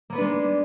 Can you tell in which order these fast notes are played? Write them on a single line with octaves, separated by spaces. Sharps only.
A#3 B3 B4 D4 G#3